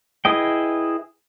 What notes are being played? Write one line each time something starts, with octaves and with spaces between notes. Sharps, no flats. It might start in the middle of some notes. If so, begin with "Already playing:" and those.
E4 G#4 B4 D#5 G5